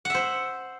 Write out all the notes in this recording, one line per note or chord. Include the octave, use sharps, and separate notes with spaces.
C5 E5 F#5